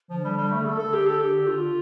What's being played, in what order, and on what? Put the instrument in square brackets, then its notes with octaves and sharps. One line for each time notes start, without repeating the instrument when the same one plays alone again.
[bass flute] D3 [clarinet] F3
[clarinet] G3
G3
A3
[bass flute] D3 [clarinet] A4
[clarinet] A4
G4
A4
G4
F4